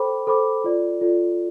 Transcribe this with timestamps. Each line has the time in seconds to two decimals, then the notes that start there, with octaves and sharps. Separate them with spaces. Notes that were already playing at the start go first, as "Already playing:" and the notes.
Already playing: A4 C5 G5 B5 D6
0.27 A4 C5 G5 B5 D6
0.64 F4 A4 D5
1.01 F4 A4 D5